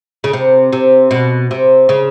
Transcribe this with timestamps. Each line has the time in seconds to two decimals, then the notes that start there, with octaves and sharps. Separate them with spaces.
0.24 C#3
0.33 C3
0.73 C3
1.11 B2
1.51 C3
1.89 C#3